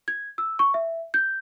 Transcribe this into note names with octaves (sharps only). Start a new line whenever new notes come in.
G#6
E6
C#6
E5
G6